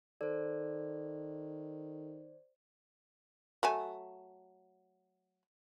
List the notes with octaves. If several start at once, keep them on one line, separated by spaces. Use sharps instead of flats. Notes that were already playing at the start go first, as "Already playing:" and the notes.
D#3 A4 C5 D5
F#3 A3 G#5